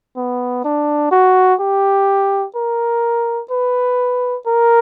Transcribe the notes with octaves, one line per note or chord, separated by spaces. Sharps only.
B3
D4
F#4
G4
A#4
B4
A#4